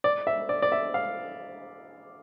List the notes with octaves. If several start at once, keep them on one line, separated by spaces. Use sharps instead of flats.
D5
E5
D5
D5
E5
F5